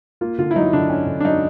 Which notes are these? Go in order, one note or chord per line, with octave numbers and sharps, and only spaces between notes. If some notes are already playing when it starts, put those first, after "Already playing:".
A#3 F4
D3 F4
E4
F#3 D#4
D3 D4
C#4
D3
D4
F#3 D#4